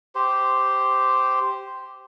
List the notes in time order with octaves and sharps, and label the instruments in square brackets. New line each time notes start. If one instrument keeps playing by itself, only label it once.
[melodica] G4 C5